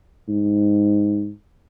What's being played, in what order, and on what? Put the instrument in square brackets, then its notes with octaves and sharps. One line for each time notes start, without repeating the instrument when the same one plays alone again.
[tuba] G#2